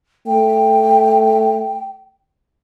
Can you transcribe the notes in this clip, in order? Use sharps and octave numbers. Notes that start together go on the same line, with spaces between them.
A3 G5